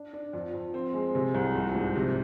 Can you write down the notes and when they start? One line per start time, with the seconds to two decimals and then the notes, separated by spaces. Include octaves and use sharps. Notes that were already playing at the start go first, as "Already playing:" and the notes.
Already playing: D4
0.13 D4
0.33 F2
0.53 F2
0.74 C4
0.94 G#3
1.15 C3
1.34 C2
1.55 A#1
1.75 G#2
1.96 C3